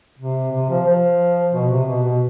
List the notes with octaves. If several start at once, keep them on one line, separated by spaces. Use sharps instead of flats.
C3
C3
F3
F3
B2
C3
B2
B2